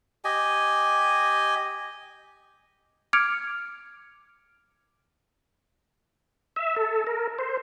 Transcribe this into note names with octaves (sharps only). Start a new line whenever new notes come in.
G4 D#5 G#5
D6 F6 G#6 C#7 D7 F7
E5
A4
A#4
C5